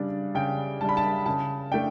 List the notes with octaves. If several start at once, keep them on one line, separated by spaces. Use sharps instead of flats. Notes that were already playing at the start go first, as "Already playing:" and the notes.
Already playing: C#3 G3 D4
C#3 G5
G3 D4 A5 B5
A5
C#3 A5
A3 D4 G5